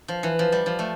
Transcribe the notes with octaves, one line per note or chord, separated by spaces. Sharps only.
F3
E3
F3
G3
F3
A3